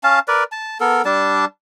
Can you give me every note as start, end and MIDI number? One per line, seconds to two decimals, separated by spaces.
0.04 0.19 61
0.04 0.19 77
0.04 0.19 81
0.28 0.44 70
0.28 0.44 71
0.28 0.44 74
0.52 0.78 81
0.80 1.02 59
0.80 1.02 69
0.80 1.02 70
1.05 1.45 55
1.05 1.45 62
1.05 1.45 81